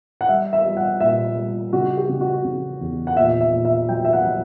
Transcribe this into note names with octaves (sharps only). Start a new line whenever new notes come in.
F#5
G3 E5
E5
G3
F#5
A#2 E5
G3
C#3 F#4
G4
C#3
F#4
C#3
E2
F#5
A#2 E5
E5
A#2
E5
F#3 G5
E5
F#5
F#3